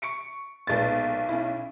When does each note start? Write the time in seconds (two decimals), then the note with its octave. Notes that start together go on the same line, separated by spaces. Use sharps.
0.02 C#6 C#7 D7
0.67 B1 A#2 G#3 B3 A6
1.29 C#4 E4